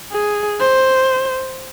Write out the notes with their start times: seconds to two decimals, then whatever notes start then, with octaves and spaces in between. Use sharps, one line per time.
0.12 G#4
0.60 C5